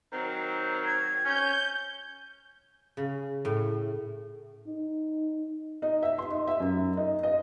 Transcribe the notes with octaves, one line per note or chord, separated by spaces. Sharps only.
D#3 F#3 C4
G#6
C#4 G6
C#3
A2
D#4
D#4
E5
C6
D#4
E5
F#2
D#4
D#5